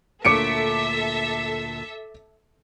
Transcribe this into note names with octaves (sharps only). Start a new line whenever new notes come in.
D2 A#2 A4 C#5 E5 D6 C#7 D7